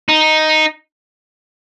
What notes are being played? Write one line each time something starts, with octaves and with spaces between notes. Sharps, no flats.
D#4